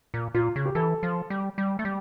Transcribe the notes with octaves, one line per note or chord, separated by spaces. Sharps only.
A#2
A#2 F4
C#3
G4
E3 A4
F3
G3
G3
A3
G3